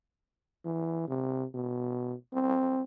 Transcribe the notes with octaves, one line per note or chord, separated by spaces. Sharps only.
E3
C3
B2
C4